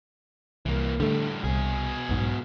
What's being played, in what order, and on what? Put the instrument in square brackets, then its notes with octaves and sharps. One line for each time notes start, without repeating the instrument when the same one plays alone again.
[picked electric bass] C2 [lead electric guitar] E3 A#3
[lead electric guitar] A2 G3 [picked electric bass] D3 A3
[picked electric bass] C2 [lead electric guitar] B2 G#4
[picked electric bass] B1 G#2